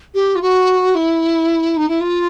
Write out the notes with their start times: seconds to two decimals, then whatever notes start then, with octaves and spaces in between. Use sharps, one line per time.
0.14 G4
0.35 F4
0.41 F#4
0.95 E4
1.76 D#4
1.88 E4
2.00 F4